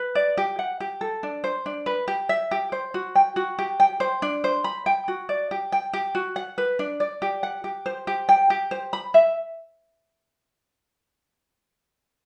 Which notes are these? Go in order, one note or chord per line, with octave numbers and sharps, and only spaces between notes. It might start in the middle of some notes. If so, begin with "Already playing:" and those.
Already playing: B4
D5
G4
F#5
G4
A4
D4
C5
D4
B4
G4
E5
G4
C5
F#4
G5
F#4
G4
G5
C5
D4
C5
B5
G5
F#4
D5
G4
G5
G4
F#4
F#5
B4
D4
D5
G4
F#5
G4
C5
G4
G5
G4
C5
B5
E5